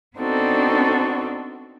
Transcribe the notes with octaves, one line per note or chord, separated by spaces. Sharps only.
B3 C4 D4 D#4 F#4 A4